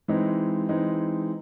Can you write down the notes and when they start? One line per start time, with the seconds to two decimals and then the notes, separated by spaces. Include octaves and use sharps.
0.08 E3 G#3 C4 D#4
0.69 E3 G#3 C4 D#4